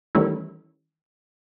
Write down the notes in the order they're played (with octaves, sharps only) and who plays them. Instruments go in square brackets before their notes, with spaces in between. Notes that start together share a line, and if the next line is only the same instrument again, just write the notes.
[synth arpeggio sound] D#3 E3 G3 A3 C#4 E4